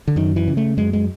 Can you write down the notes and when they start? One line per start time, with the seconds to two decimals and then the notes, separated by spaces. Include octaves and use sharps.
0.08 D3
0.16 F#2 D#3
0.36 E3
0.48 C#3
0.57 A3
0.77 F#2 G#3
0.93 G#3